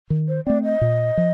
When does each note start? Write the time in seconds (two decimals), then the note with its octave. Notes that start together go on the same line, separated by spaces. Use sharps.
0.10 D#3
0.28 C5
0.46 A3 C4 D5
0.64 D#5
0.81 A#2
1.17 F3